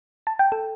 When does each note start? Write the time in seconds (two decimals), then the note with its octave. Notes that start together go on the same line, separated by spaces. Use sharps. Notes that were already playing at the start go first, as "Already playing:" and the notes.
0.27 A5
0.39 G5
0.52 A4